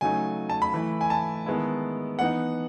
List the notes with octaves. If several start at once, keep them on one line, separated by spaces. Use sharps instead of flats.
C#3 F#3 A3 D#4 G#5
A5
B5
E3 A3 E4
G#5
A5
D#3 G#3 B3 E4
E3 B3 D#4 F#5